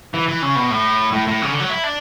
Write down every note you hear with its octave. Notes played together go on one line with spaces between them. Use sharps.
E3
E3
C#3
B2
A2
A2
A2
C#3
D3
F#3
E4
D4